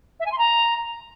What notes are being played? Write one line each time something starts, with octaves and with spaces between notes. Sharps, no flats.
E5
G#5
C6
A#5